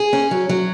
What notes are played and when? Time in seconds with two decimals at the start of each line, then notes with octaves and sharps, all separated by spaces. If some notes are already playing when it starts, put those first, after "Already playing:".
Already playing: G#4
0.13 C#4
0.31 F#3
0.49 F#3